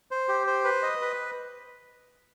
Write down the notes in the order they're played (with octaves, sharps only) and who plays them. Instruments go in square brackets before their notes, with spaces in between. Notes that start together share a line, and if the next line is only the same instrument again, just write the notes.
[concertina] C5
G4
C5
B4
D#5
B4